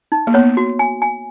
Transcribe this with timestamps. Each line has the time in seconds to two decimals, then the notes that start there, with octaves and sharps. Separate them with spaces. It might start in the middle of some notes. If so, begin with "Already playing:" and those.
0.12 D#4
0.27 A#3
0.34 B3 C#5
0.57 F#4
0.79 G#5
1.02 G#5